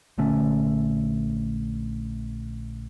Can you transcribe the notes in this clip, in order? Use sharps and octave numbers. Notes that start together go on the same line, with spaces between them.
A#1 D3 A3 C#4